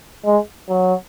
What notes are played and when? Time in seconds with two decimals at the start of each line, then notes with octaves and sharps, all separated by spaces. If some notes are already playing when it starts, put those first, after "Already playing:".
0.25 G#3
0.69 F#3